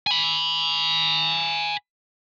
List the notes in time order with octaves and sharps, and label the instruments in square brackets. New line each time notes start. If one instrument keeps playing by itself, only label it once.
[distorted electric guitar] G#5 B5